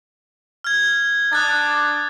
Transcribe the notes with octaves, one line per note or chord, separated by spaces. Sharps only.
F6 G#6
D4 D#6 F#6 A6